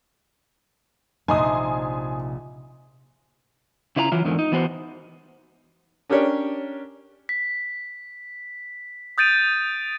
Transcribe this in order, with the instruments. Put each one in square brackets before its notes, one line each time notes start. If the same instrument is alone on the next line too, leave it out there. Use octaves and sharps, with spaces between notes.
[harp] A#1 C3 [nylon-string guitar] D#4 [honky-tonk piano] G#5 C6 D#6
[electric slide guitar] C#3 E4 F4 C#5 A#5
E3 F#3 E4 F4
E2 G#2 D3 D#3 F3
D#4
E3 B3 F#4 C5
[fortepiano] C#4 D4 G4 A#4 C#5 D5
[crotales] B6
D#6 G6 A6 D7 D#7